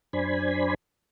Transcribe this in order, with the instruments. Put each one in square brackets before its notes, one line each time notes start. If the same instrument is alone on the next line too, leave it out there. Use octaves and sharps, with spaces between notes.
[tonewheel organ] F#2 D4 C5 G#5 B5